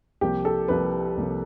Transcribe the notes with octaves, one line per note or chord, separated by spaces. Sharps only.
C2 C3 F3 A#3 G4
A4
C2 C3 F3 A#3 B4
C2 C3 F3 A#3